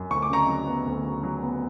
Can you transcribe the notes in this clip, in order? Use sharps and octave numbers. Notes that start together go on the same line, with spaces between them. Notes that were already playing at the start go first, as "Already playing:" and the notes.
Already playing: F#2
D2 C#6
D6
C#3 A#5 C#6
F#3
B3
D2
C#3
F#3
B3